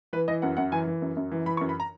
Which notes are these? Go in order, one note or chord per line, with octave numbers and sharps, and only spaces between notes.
E3 B4
E3 D#5
F#2 F#5
F#2 F#5
E3 G#5
E3
F#2
F#2
E3
E3 B5
C#6
F#2
B5
A#5